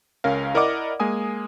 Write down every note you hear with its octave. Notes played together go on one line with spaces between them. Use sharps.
C#2 C#4 A#4 F5
E4 A#4 D5 D#5 F#5 D6
G#3 A#3 G#5 D#6